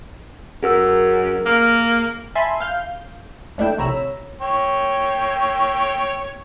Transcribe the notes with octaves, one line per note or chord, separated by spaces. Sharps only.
F#2 G#4 A#4 E6
A#3
E5 G#5 A5 B5 C6
F5 G6
D#2 A3 D4 E4 G5 E7
A#1 C3 C#5 A#5 B5 E6
C#5 G5